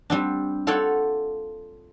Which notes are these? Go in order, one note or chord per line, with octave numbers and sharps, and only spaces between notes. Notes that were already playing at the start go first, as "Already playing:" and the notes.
G3 C4 D4
F4 A4 C#5 D5 F#5 G5